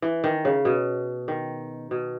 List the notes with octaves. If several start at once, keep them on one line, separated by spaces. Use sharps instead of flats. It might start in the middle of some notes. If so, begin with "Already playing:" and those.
E3
D#3
C#3
B2
D#3
B2